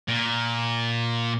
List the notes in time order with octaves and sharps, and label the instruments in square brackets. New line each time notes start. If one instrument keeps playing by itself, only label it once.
[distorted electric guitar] A#2